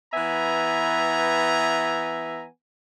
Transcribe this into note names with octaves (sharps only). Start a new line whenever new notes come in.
E3 B3 E5 G#5 A#5